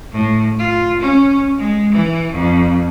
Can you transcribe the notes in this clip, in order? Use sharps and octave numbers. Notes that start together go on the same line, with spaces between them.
A2
F4
C#4
G#3
E3
F2